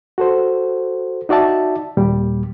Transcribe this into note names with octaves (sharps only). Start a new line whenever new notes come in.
F#4 A4 C5
D#4 F#4 D5 E5 A5
D#2 A#2 G3